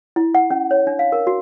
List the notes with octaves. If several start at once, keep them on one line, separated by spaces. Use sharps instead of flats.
E4
F#5
C#4
C#5
D4
F5
A#4
F#4